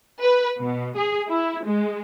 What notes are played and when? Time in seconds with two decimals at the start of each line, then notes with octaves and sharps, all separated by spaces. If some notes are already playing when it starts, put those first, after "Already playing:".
0.21 B4
0.60 B2
0.97 G#4
1.29 E4
1.65 G#3